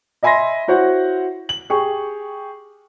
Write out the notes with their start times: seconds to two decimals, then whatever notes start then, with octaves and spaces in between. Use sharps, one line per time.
0.23 D#5 E5 G#5 B5 C6 A#6
0.68 E4 F#4 C5 C#5 F#5
1.49 F#7
1.70 G4 G#4 C#6